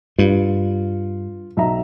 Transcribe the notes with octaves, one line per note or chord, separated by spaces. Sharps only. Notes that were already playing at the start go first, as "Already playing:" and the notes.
G2 F4
B1 E5 A#5